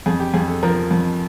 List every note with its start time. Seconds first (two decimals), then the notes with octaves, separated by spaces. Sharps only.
0.06 F2 G#4
0.20 G4
0.34 F2 G#4
0.48 A4
0.63 F3 A#4
0.91 F2